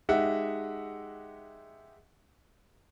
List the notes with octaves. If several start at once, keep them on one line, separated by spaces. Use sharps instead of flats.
G#3 D#4 G4 E5 F#5